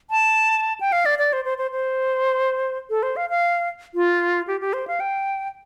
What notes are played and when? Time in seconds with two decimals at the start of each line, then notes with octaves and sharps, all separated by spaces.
0.10 A5
0.80 G5
0.92 F5
1.06 D5
1.19 D5
1.33 C5
1.45 C5
1.58 C5
1.71 C5
2.90 A4
3.03 C5
3.16 F5
3.30 F5
3.94 F4
4.47 G4
4.61 G4
4.73 C5
4.87 F5
5.00 G5